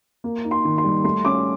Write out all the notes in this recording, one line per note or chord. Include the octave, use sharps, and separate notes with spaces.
A#3
D#4
C6
D#3
C6
G3
A3 C6
C#4 D6